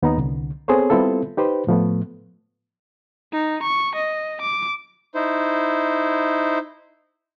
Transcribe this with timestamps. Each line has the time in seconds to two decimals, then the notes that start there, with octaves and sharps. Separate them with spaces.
0.02 D#2 B3 D#4 A#5
0.18 C2 D3
0.68 B3 C4 G#4 A4 C5 C#5
0.90 G3 B3 C4 E4 F4 A4
1.37 D#4 G4 B4 C5
1.67 A2 F3 A3 B3
3.33 D#4
3.63 C#6
3.95 D#5
4.41 D6
5.15 D#4 E4 C5